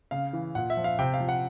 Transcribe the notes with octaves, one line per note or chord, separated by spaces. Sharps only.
C#3 F5
E3
A#2 F#5
E5
F3
F5
C3 G5
F5
F3
F#5